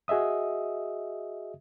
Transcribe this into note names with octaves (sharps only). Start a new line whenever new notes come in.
F#4 G#4 D#5 E5 D#6